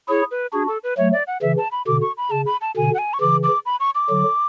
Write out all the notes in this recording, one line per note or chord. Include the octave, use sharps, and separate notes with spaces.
E4 G#4 C#5
B4
D4 F#4 G#4
A4
B4
F#3 A3 C#5
D5
F#5
C#3 E3 E5
A5
B5
B2 D3 D6
C#6
B5
C#3 A5
B5
A5
B2 D3 G#5
F#5
G#5
C#6
C#3 E3 D6
D6
B5
C#6
D6
D3 F#3